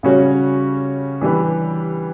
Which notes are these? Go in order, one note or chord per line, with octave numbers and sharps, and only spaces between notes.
C#3 G3 C#4 F#4 C#5
E3 G3 D4 G4 B4